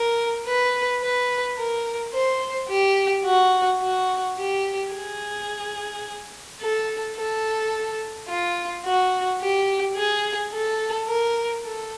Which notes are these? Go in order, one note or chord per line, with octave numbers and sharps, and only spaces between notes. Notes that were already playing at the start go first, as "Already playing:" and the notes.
Already playing: A#4
B4
B4
A#4
C5
G4
F#4
F#4
G4
G#4
A4
A4
F4
F#4
G4
G#4
A4
A#4
A4